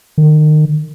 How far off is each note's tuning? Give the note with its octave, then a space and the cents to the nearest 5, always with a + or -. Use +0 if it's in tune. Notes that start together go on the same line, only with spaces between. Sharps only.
D#3 -30